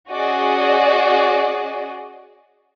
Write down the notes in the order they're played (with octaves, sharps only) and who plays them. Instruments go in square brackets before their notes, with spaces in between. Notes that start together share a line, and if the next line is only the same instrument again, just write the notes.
[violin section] C#4 F#4 G#4 D5 D#5